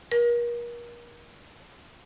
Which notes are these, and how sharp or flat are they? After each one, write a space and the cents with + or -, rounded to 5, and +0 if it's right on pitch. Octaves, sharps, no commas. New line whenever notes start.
A#4 +35